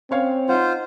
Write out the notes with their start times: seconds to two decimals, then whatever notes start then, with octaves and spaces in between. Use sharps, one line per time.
0.11 C4 C#4 C#5 F5
0.49 D#4 F4 C5 F#5